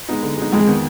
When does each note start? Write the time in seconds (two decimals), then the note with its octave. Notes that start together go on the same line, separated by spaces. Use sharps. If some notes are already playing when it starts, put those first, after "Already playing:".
0.09 G#3 B3 D#4
0.23 D3
0.37 G#3 B3 D#4
0.52 F2 G#3
0.67 D#3 B3